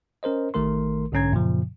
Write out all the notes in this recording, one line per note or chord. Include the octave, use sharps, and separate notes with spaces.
C#4 A#4 C5 D#5
A1 D#3 A3 A#4 C6
B1 G#2 D3 C#4 A#5 G#6
F#2 A#2 C#3 F3